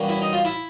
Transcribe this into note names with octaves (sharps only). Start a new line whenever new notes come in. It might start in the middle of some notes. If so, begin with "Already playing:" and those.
Already playing: E2 B2 G3 A#3 C#4
E4
D#4
F4
E4